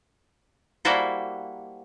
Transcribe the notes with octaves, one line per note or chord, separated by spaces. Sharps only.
G3 A#3 E4 F#4 A4 C5